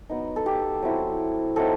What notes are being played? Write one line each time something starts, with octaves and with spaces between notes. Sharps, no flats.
F#3 B3 D#4
A4
G4
F#3 C4 E4
F#3 A3 C4 D#4 A4